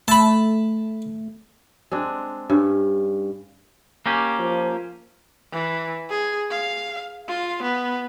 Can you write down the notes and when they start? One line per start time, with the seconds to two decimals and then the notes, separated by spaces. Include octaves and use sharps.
0.08 A3 A5 B5
1.91 G#3 C4 D4
2.50 G2 C#4
4.06 A#3 C#4 G4
4.39 F3
5.53 E3
6.10 G#4
6.51 F5
7.29 F4
7.63 B3